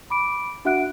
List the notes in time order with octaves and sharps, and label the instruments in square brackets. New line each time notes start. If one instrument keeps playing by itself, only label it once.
[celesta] B5 D6 D7
D4 F#4 E5 F#5 F#6 D7